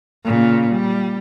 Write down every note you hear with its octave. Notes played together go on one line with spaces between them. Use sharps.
A#2 C#3
G3